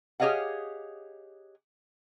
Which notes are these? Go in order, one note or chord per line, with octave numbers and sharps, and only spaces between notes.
G4 G#4 C#5 D#5 F5 F#5